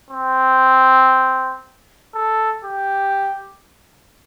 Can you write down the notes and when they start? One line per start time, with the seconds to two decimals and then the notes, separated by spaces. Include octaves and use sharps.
0.10 C4
2.15 A4
2.65 G4